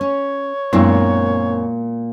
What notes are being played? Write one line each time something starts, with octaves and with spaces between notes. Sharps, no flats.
C#4 C#5
F#2 A#2 G#3 B3 C4 D4 E4